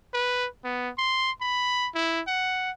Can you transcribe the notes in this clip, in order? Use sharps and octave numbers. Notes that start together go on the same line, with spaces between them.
B4
B3
C6
B5
E4
F#5